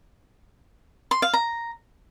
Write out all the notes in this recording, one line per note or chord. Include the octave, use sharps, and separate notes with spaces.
C6
F5
A#5